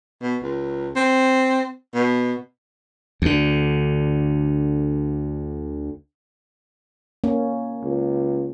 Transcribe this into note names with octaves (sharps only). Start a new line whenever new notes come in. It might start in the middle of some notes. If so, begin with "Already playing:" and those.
B2
C#2
C4
B2
D2 D3
A#3 C#4
C#2